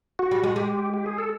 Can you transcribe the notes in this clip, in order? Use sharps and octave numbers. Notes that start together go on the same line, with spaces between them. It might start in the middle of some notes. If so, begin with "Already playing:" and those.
F#4
G3
G#3
G#3 G4
G4
G#4
A4